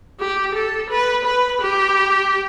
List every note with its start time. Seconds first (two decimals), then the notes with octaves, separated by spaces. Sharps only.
0.19 G4
0.55 A4
0.90 B4
1.25 B4
1.61 G4